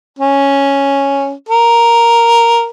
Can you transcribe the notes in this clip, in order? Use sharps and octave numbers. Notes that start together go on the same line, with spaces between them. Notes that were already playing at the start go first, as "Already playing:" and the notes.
C#4
A#4